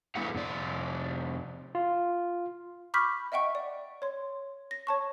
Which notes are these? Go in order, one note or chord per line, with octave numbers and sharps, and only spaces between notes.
G#3 A3 B3 E4 G#4 F#5
F2 C3 D5
F4
B5 C#6 D6 F6 G6 B6
D#5 E5 F#5 G5 C#6
D5
C#5 C6
A#6
C#5 A5 C#6